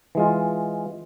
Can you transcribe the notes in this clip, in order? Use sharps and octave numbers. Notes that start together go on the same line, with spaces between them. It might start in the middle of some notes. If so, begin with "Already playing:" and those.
E3 G#3 F4